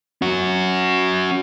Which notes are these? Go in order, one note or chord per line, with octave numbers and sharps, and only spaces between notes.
C#4 F#4